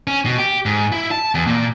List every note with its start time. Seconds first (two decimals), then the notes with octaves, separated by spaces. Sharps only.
0.07 C#4
0.26 B2
0.38 G4
0.66 G#2
0.92 E4
1.11 A5
1.35 E2
1.47 A#2